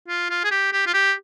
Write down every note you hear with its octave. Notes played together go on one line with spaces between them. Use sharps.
F4
F4
G#4
G4
G4
F4
G4